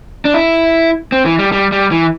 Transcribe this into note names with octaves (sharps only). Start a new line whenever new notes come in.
D4
E4
C4
E3
G3
G3
G3
E3